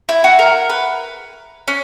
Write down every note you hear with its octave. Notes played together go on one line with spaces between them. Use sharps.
E4
F#4
A#4
B4
C#4